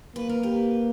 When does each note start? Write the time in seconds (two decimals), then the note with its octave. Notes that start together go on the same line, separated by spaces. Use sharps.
0.16 A#3 B4
0.29 A#4
0.43 G4 B4